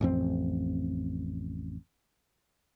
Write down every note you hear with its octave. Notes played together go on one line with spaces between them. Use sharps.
A1 F2 C4